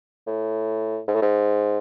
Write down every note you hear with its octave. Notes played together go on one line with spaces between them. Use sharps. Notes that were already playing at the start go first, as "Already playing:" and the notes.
A2
G#2
A2
G#2